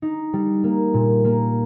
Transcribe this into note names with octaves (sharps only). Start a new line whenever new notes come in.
D#4
G3
A#3
A#2
A#3